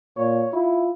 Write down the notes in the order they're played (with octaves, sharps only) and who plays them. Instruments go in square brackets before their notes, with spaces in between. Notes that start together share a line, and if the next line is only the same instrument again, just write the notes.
[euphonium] A#2 [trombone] C#5
[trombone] E4 [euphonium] F4